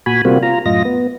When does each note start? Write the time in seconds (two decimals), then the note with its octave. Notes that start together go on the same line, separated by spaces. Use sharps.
0.06 A#2 F#4 G#5 B5
0.25 C3 G3 A#3 C4 F4 F#4
0.43 F4 A#5
0.66 F#2 A2 F4 D#5 A#6
0.85 B3